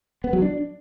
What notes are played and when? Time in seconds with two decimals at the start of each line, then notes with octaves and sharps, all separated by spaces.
0.24 B3
0.33 F#3
0.42 D4